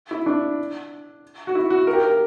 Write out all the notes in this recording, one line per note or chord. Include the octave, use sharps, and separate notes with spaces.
E4
D4
F#4
E4
F#4
A#4
G4
A#4